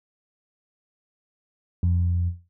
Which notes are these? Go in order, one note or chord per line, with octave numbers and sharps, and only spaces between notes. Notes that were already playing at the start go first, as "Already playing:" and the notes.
F2